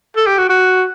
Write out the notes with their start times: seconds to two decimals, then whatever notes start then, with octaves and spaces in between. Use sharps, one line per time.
0.16 A4
0.27 G4
0.38 F#4
0.49 F#4